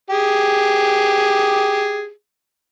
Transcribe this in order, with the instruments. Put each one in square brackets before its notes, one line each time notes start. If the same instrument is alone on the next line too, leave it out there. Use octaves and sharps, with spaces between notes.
[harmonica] G4 G#4